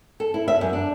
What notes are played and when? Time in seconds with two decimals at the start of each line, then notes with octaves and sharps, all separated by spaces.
0.20 A4
0.34 E4
0.48 E5
0.61 F#2
0.73 D4